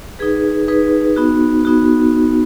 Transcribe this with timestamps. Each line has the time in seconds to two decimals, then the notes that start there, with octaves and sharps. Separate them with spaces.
0.19 D#4 G#4 B4
0.68 D#4 G#4 B4
1.16 B3 D#4 F#4
1.65 B3 D#4 F#4